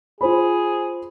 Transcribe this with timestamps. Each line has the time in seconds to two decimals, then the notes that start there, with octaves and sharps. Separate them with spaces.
0.21 F4 G#4 C5 B5